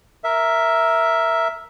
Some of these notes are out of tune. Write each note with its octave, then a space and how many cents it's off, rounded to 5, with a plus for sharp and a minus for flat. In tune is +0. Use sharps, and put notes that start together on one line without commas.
A#4 +0 E5 +0